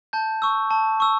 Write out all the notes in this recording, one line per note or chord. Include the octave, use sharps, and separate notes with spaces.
A5 G6
C#6 E6
A5
C#6 E6